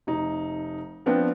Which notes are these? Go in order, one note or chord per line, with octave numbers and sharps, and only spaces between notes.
F1 D#4
F3 B3 C4 D4